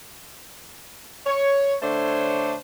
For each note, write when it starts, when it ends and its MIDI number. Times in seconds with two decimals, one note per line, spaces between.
1.26 1.75 73
1.82 2.55 50
1.82 2.55 57
1.82 2.55 62
1.82 2.55 72
1.82 2.55 73